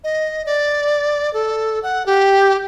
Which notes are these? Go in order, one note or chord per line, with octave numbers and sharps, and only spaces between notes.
D#5
D5
A4
F#5
G4